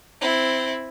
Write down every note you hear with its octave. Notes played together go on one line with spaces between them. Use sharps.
C4 E4